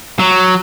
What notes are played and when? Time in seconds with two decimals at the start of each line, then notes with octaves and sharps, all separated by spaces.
0.19 F#3